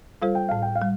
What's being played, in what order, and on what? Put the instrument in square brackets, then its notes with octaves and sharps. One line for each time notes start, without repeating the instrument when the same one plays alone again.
[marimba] G3 F4 A4 C5 [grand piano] F5
[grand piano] G5
[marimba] A2 [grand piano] F5
[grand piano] G5
F5
[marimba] G3